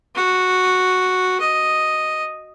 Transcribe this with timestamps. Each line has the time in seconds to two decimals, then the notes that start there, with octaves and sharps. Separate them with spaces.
0.15 F#4
1.40 D#5